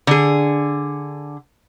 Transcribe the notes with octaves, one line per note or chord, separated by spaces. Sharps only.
D3 G#4